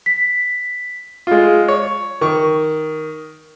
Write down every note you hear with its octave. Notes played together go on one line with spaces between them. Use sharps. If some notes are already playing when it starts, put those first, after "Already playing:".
B6
G#3 F4
C#5
D#3 C#6